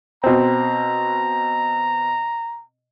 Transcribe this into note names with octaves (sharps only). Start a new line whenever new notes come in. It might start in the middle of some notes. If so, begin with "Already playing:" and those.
B2 C4 A#5